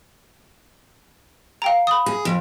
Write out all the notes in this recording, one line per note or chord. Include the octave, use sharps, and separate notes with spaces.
F5 G5 A#5
B5 D#6
G#4
F2